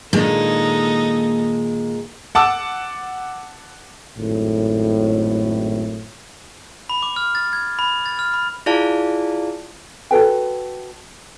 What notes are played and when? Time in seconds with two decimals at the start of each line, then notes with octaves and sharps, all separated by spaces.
0.13 A#2 D#3 G#3 A#3 D4 D#4 A4
2.35 F#5 A5 D6 E6
4.18 G#1 F#2 A2
6.89 B5
7.02 D6
7.16 F6
7.35 A6
7.53 G#6
7.79 B5
8.06 A6
8.19 F6
8.34 B5
8.66 E4 F4 G#4 D5 F5 A5
10.11 F#4 A4 B4 G5